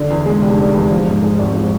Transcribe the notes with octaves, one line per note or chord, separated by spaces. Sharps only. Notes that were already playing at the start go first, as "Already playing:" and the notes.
Already playing: D3
E2
G#3
F1
D3
E2
F3
G#2
G#3
G#1
F3